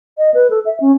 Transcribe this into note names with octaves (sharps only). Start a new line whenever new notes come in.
D#5
B4
A4
E5
C#4